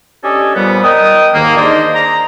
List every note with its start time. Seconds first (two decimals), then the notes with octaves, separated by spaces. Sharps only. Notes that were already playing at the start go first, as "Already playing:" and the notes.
0.24 C#4 D4 G4 A4 D#5 G#5
0.55 A#2 F3 G3 B3
0.84 A#4 D#5 G5 D#6
1.34 D#2 G#2 D#3 A#3
1.57 D4 D#4 G#4 C5 D5 D#5
1.95 A#5